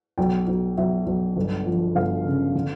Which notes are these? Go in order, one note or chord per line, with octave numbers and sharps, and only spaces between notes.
B1 G5
B1
B1 E5
B1
G1
F3
G1 F5
C#3
D3